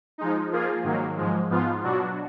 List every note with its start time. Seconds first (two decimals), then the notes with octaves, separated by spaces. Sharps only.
0.18 F3 G#3 D#4
0.51 F3 A#3 F4 G#4
0.83 G#2 D#3 F#3 A#3
1.17 G#2 F3 G#3
1.50 G#2 F3 B3 F4
1.83 B2 F#3 D4 F#4